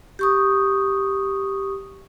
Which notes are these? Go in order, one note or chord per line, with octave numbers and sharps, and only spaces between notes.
G4 C#6 D#6